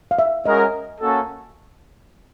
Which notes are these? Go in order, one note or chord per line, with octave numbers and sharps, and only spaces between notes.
F5
E5
G#3 C#4 F#4 A#4 D#5
A#3 C#4 F#4 A4